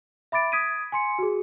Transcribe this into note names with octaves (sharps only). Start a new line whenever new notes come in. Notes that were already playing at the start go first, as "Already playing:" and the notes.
E5 B5 D6 A6 D7
D#6 G#6 B6 D7 D#7
G#5 C6 C#7
F#4 G#4